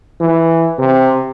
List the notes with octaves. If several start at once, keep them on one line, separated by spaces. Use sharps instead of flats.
E3
C3